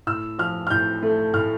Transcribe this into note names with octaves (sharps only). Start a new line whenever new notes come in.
A2 E6
F3 F6
F6
A2 G6
A3
A2 F6